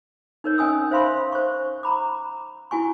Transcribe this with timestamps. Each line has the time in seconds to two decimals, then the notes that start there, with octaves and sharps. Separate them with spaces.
0.44 D#4 A#4 C#5
0.58 C#4 D#5 G#5 D#6 E6
0.91 C5 E5 F5 B5 C6
1.32 C5 C#6
1.83 A#5 B5 D6
2.71 E4 F#4 G#5 C#6